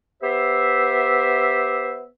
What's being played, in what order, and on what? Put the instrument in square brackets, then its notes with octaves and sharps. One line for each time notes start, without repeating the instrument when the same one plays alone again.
[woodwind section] B3 G4 C5 E5